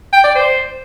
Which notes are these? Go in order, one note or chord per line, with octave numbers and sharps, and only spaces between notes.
G5
D5
C5